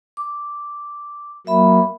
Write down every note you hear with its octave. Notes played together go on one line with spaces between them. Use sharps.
D6
F#3 A#3 E5 B5